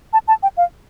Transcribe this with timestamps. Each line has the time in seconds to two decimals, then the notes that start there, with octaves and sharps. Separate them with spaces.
0.13 A5
0.28 A5
0.43 G5
0.57 F5